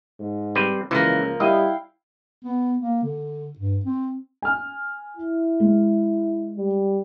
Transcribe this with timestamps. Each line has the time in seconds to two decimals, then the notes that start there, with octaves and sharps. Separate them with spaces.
0.20 G#2
0.55 G3 C4 B4
0.91 C#2 E3 F3 A#3
1.40 G3 E4 D#5 F5 G5
2.44 B3
2.79 A#3
3.03 D3
3.59 G2
3.85 C4
4.42 G#5 F6
5.17 E4
5.60 G#3
6.58 G3